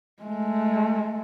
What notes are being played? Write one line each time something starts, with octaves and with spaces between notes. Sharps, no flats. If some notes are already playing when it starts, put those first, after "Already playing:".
G#3 A3